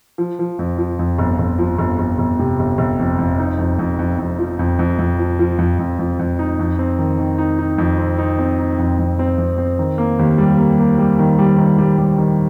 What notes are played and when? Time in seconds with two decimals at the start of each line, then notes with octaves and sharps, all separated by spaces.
0.18 F3
0.39 F3
0.59 F2
0.78 F3
0.99 F2
1.18 G1
1.39 G1
1.59 F3
1.78 G1
1.99 G1
2.18 G1
2.39 C3
2.59 G1
2.78 G1
2.99 F2
3.19 F2
3.38 D#4
3.59 F2
3.79 F2
3.99 F2
4.19 F2
4.39 F3
4.59 F2
4.79 F2
4.99 F2
5.19 F3
5.39 F3
5.58 F2
5.79 F2
5.99 F2
6.19 F2
6.39 D#4
6.59 F2
6.79 C4
6.99 D#3
7.19 D#3
7.38 D#4
7.59 D#4
7.78 F2
7.98 C4
8.18 D#4
8.39 C4
8.59 D#4
8.79 F2
8.99 F2
9.19 C4
9.38 F2
9.58 C4
9.79 D#3
9.98 A#3
10.19 D#2
10.38 G3
10.58 A#3
10.79 A#3
10.98 G3
11.19 D#3
11.39 G3
11.58 D#3
11.78 G3
11.98 G3
12.18 D#3